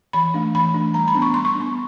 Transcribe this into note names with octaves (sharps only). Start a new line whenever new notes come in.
E3 B5
A3 D4
E3 B5
A3 D4
G3 A#5
B5
B3 D4
C#6
G3 C6
C#6
D4
B3